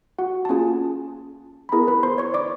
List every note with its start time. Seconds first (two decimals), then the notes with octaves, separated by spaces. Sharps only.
0.19 F#4 F#5
0.45 A5
0.49 A#3 C#4 F4 G#4 G#5
1.69 B5
1.72 B3 E4 G#4 A#4 A#5
1.87 B4 B5
2.03 C5 C6
2.18 C#5 C#6
2.34 D5 D6